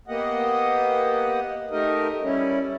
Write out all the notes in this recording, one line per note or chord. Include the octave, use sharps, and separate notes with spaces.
A#3 B3 G4 D#5 F#5
A3 D#4 G4 A#4 D#5
G3 C#4 E4